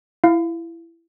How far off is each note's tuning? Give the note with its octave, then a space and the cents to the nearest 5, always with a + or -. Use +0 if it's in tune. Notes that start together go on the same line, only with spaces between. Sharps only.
E4 +15 F5 +0